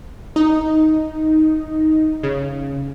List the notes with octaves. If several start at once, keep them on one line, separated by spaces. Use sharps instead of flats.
D#4
C#3